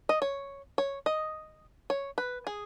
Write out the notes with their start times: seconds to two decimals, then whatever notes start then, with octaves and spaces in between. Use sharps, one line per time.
0.09 D#5
0.22 C#5
0.78 C#5
1.06 D#5
1.90 C#5
2.18 B4
2.47 G#4